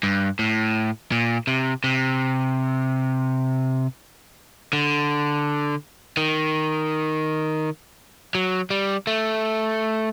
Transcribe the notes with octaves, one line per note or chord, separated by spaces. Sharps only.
G2
A2
A#2
C3
C3
D3
D#3
F#3
G3
A3